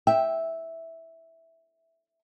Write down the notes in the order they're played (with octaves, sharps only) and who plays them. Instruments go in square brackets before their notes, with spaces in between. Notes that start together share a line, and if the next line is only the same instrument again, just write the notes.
[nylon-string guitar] E5 [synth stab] G5